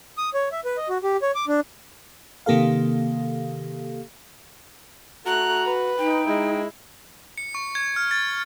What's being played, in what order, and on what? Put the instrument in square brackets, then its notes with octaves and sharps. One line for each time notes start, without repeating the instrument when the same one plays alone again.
[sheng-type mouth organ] D#6
C#5
E5
B4
D#5
F#4
G4
C#5
D6
D4
[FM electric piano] C3 D#3 A#3 G4 A4 F5
[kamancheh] A3 F#6 [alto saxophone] F#4 [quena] A#5
[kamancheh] B4
[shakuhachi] D#4 [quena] G5
[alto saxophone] G#3 [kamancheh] E4
[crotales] C#7
C#6
G#6
F6
A6